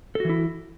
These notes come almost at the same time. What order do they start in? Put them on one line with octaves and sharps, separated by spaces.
A4 F#4 E3 E4